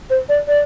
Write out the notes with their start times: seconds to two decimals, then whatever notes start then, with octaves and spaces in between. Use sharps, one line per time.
0.10 C5
0.29 D5
0.48 D5